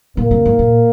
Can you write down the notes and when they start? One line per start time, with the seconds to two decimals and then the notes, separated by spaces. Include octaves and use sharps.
0.17 A#2 A#3
0.31 C3
0.45 G#2
0.59 A#2